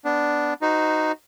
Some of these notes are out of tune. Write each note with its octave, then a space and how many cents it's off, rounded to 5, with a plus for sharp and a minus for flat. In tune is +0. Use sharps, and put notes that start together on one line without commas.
B3 +0 D4 +0
D#4 +0 F#4 +0 C5 -30